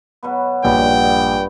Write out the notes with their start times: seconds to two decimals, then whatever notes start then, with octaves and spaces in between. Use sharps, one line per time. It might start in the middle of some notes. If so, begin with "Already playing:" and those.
0.23 B2 F#3 B3
0.64 A#1 G2 B3 G5